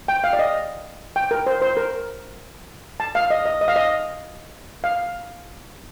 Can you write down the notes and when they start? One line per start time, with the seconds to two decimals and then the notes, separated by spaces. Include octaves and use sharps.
0.08 G5
0.24 F5
0.33 D5
0.39 D#5
1.16 G5
1.31 A#4
1.47 C5
1.62 C5
1.77 A#4
3.00 A5
3.15 F5
3.30 D#5
3.46 D#5
3.61 D#5
3.68 F5
3.76 D#5
4.84 F5